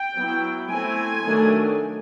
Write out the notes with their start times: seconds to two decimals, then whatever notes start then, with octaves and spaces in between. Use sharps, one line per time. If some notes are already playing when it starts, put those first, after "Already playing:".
Already playing: G5
0.16 F#3 B3 E4
0.70 A3 C4 E4 G#5
1.23 D#3 F#3 A3 D4